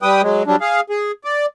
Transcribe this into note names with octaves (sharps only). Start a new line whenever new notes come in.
G3 B4 G5 D#6
F#3 G#3
F#3 G3 D4
G#4 F5
G#4
D5